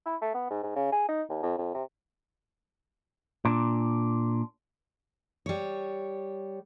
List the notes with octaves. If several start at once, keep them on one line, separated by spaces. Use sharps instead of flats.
E4
A3
B3
G#2
G#2
C#3
G#4
D#4
D#2
F2
F2
C3
A#2 D4
G3 C#5